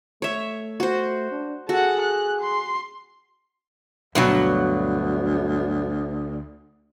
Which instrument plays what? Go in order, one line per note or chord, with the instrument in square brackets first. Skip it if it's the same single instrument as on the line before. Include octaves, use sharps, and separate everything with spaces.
[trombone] A3 [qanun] C#5 E5
[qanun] F#4 C5
[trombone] D4
[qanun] F#4 [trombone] G#4 [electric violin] A4 F#5
[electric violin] F#6
C6
[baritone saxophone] D2 [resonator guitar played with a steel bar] G2 B2 F#3